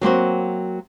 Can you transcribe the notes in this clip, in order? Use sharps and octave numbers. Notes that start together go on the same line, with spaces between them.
F#3 A#3 C4 F#4